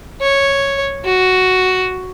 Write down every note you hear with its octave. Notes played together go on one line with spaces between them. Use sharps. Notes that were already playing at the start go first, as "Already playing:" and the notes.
C#5
F#4